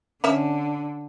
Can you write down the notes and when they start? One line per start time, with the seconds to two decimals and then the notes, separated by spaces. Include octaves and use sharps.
0.24 D3 C#4 C#5 E5